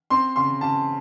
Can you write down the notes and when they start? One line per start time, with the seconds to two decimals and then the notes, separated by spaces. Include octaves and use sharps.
0.10 C4 C6
0.36 C#3 C6
0.61 C#3 A5